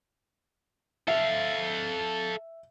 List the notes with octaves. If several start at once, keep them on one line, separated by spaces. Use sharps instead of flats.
A4 E5 F5